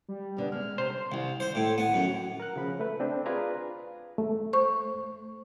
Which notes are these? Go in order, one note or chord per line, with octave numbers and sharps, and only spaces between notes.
G3
F2 D3 B3
G#3 A3 F6
C3 C5
C2
C5
A2
B3
F#2
A#4 F#6
C#3 F3 B5
A3 B4
C4 D4
F4 G#4 B4 D5 G#5 A#5
A3
C5 C#6